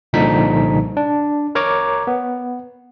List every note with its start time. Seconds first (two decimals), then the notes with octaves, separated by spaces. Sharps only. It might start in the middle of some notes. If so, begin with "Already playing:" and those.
0.13 C2 A#2 D3 F3 D#4 B6
0.97 D4
1.55 A#4 C#5 A#5 D6
2.07 B3